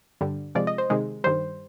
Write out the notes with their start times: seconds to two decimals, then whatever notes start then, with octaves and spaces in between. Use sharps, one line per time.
0.21 G2 D3 G3
0.55 C3 F3 G#3 D5
0.67 D#5
0.78 C5
0.90 C3 D#3 G#3
1.24 G2 D#3 G3 C5